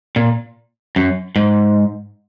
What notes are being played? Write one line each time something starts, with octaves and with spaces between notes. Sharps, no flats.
A#2
F#2
G#2